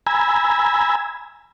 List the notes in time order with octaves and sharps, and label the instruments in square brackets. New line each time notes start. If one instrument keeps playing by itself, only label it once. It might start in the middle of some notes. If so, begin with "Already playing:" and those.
[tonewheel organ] G#5 A#5 B5 E6 G#6